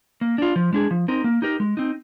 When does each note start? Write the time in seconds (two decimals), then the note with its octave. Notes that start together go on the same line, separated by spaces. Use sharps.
0.21 A#3
0.38 D4 F4
0.56 F3
0.73 G#3 D4 G#4
0.91 F3
1.08 C4 D#4 A#4
1.24 A#3
1.42 D#4 G4 A#4
1.60 G#3
1.77 C4 D#4